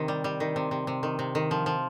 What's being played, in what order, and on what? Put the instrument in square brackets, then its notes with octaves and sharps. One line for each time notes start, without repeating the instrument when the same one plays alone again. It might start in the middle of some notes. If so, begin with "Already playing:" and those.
Already playing: [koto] C3 D#3
G3
G3
D#3
C3
C3
C3
D#3
C3
D#3
F3
F3